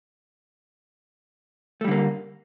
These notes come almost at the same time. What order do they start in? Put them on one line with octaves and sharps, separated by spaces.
A3 G3 D3 A#3